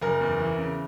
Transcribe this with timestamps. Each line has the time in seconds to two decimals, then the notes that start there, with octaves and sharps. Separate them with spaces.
0.02 F#1 A#4
0.21 E2
0.39 E3
0.58 C#3